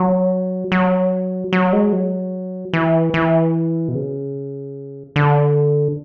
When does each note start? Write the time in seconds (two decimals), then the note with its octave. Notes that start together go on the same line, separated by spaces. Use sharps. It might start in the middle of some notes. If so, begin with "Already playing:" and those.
Already playing: F#3
0.72 F#3
1.53 F#3
1.73 G#3
1.93 F#3
2.73 E3
3.14 E3
3.88 B2
3.95 C#3
5.16 D3